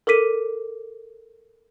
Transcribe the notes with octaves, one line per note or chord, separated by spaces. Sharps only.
A4 A#4 D6 B6 D#7